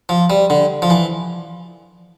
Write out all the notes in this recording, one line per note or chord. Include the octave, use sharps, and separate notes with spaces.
F3
G3
D3
F3
E3